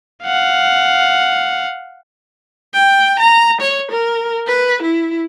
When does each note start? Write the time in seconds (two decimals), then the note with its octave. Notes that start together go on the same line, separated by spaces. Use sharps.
0.24 F5 F#5
2.74 G5
3.19 A#5
3.61 C#5
3.91 A#4
4.47 B4
4.82 E4